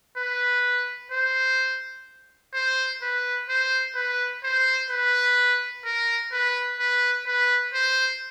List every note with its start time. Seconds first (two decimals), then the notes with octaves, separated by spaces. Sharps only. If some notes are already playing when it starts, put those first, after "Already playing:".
0.17 B4
1.12 C5
2.54 C5
3.02 B4
3.49 C5
3.95 B4
4.44 C5
4.91 B4
5.85 A#4
6.33 B4
6.80 B4
7.27 B4
7.74 C5